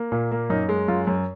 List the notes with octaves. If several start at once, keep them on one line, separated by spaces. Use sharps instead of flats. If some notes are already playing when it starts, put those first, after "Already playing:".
Already playing: A#3
A#2
A#3
F#2 D#4
G#3
F#2 F4
F#2